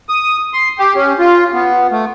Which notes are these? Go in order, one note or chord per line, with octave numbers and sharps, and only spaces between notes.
D#6
C6
G4
C#4
F4
B3
A3